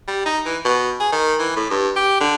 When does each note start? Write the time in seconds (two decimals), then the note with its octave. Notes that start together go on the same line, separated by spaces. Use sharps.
0.08 G3
0.26 D#4
0.46 E3
0.65 B2
1.00 G#4
1.12 D#3
1.39 E3
1.56 A2
1.70 G2
1.96 G4
2.20 D3